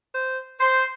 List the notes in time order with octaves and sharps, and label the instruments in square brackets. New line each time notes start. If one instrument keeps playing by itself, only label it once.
[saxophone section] C5
C5